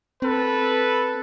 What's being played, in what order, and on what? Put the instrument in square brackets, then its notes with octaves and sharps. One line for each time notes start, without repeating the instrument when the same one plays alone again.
[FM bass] C4 [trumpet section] A4 B4